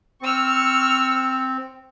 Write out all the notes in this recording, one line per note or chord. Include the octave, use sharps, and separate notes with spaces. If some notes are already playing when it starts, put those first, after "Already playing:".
C4 C#6 E6 F6